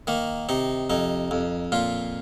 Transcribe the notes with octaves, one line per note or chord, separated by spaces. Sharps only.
D#3 A#3
C3 D#4
F2 D#4
F2
A#2 F4